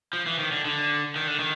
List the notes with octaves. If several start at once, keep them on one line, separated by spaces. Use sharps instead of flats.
F3
E3
D#3
D3
D3
D#3
D3
D#3